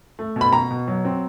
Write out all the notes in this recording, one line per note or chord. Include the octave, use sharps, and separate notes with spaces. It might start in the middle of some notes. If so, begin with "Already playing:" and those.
A3
B2
B5
B2 A#5
B2
F#3
C4